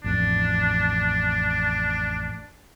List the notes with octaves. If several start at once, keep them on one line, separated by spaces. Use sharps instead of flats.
A1 F2 D4